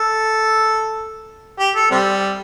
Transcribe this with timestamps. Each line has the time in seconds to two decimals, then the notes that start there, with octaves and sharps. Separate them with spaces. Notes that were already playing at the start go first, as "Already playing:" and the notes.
Already playing: A4
1.59 G4
1.75 A4
1.91 C3 G3